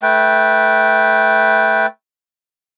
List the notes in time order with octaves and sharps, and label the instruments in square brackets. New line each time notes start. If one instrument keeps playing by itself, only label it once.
[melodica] A3 B4 G5